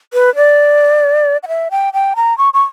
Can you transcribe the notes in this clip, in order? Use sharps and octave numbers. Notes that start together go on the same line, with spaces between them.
B4
D5
F#5
E5
G5
G5
A#5
C#6
C#6